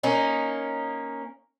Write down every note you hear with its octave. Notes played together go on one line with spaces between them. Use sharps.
A#3 C#4 D#4